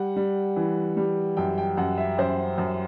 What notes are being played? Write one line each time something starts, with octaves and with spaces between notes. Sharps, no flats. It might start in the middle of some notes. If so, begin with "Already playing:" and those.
Already playing: G3 F#5
G3
E3
G3
F#2 G5
G5
F#2 F#5
E5
F#2 C5
F#2